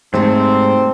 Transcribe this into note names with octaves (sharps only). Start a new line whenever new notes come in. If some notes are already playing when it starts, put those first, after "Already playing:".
G#2 C3 G3 A3 C4